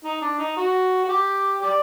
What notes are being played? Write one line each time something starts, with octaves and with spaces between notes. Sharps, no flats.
D#4
D4
D#4
F#4
F#4
G4
G4 D5